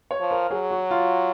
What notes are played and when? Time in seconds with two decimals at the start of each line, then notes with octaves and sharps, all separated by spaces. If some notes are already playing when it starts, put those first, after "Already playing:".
0.11 C#5
0.20 F3
0.31 A#4
0.50 F#3 G#4
0.71 F#4
0.91 F4